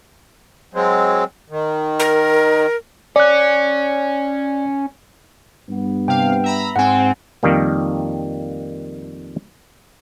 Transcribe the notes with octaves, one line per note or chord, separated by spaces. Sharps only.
F#3 G#3 C4
D#3
A#4
C#4 D5 F#6
G2 B3
C3 F5 G5
E5 A#5 B5
G#2 C4 F#5 G#5
F2 D#3 G3 A#3